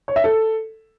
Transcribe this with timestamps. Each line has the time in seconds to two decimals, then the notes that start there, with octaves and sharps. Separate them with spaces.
0.08 C#5
0.16 E5
0.24 A4